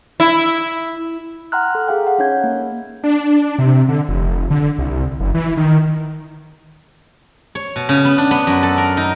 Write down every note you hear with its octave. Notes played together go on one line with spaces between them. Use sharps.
E4
F#5 G5 A#5 C6 F6 F#6
A4
G#4 F5 G5
F#5
C#4 D#4 C#5 G6 G#6
A#3
D4
C3
D3
F1
D3
C2
F#1
E3
D#3
C#5
B2
C#3
B3
D4
B3
F#2
A4
A#4
D#4